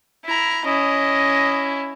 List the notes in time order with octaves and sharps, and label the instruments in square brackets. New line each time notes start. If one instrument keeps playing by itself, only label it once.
[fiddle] E4 A#5
[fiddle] C#4 E4 [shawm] D#5